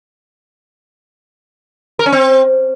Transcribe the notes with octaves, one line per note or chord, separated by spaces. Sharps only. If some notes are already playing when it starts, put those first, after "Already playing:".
A#4
C#4
C4